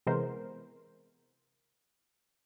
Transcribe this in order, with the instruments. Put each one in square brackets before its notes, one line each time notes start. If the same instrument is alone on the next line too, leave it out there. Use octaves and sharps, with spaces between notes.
[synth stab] C3 E3 G#3 B3 A#4 C5